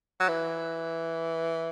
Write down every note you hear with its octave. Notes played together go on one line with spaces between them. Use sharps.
F#3
E3